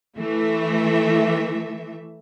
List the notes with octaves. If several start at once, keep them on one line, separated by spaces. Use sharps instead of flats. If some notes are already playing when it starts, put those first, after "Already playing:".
E3 A3 E5